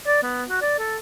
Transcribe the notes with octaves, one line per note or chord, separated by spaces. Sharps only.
D5
B3
F#4
D5
A4